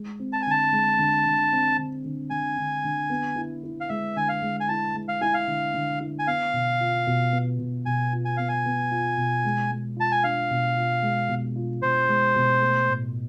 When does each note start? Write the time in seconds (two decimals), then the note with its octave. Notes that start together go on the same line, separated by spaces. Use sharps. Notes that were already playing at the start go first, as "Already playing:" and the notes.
Already playing: G#3
0.19 C4
0.33 A5
0.42 G#5
0.46 D3 A5
0.72 G#3
0.99 D3
1.25 D3
1.52 C4
1.78 D3
2.04 D3
2.30 D3 G#5
2.57 D3
2.84 D3
3.10 B3
3.36 E4
3.63 E4
3.81 F5
3.89 G#3 E5
4.16 D3 G#5
4.29 F5
4.42 G#3
4.60 G#5
4.68 E4 A5
4.94 G#3
5.08 F5
5.21 E4 G#5
5.34 F5
5.47 D3
5.74 D3
6.00 E4
6.19 G#5
6.27 B3 F5
6.53 B2
6.80 F4
7.07 B2
7.32 B3
7.59 B2
7.86 B2 G#5
8.13 F4
8.25 G#5
8.37 B3 F5
8.49 G#5
8.65 B3
8.91 F4
9.17 B2
9.45 G#3
9.71 G#3
9.97 F4 A5
10.12 G#5
10.24 D4 F5
10.51 B2
10.77 F4
11.02 G#3
11.29 B2
11.56 F4
11.82 B2 C5
12.08 G#3
12.36 B2
12.61 A3
12.88 A2